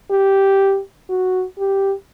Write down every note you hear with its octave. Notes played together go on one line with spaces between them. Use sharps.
G4
F#4
G4